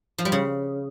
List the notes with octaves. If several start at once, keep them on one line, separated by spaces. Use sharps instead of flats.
F3
G3
C#3